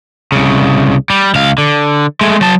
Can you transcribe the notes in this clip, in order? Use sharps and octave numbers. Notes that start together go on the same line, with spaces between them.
C2 C#3
G3
C#2 F5
D3
G#3 A3
F#3 A5